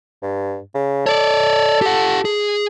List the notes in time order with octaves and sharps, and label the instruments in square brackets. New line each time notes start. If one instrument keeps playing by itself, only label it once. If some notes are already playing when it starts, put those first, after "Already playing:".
[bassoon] G2
C#3
[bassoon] A4 [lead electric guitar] C#5 D5
[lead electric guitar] G4 F#5
G#4